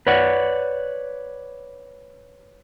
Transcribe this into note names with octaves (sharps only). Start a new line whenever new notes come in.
B4 C#5 D5 F#5